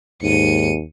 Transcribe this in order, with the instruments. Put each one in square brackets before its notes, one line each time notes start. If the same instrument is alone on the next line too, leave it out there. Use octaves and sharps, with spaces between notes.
[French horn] D#2 [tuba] G#2 [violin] C#7 D#7